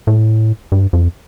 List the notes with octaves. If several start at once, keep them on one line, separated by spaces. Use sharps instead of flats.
A2
G2
F2